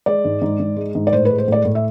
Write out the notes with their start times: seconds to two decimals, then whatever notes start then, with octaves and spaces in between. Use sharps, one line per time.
0.06 G#3 D5
0.25 G#2
0.42 G#2
0.60 G#2
0.76 G#3
0.95 G#2
1.07 D5
1.12 A2 C5
1.25 B4
1.30 G#3
1.38 C5
1.48 A2 D5
1.65 A2
1.75 E5